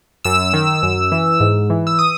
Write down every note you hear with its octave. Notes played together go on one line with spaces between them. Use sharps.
F#2 E6
D#3
F#2
E3
G#2
E3
E6
D#6